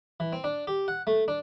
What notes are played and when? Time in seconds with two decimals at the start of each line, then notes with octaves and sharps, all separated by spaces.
0.20 E3
0.33 C4
0.44 D4
0.67 G4
0.88 F#5
1.07 A3
1.28 D4